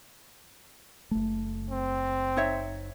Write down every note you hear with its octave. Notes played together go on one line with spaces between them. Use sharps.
F#1 A3
C4
D#4 C#5 E5